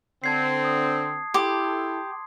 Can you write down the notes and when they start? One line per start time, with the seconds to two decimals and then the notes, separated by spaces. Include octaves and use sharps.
0.24 D3 C4 A5 G#6 C7
0.64 D#6
1.34 E4 G4 A4 C6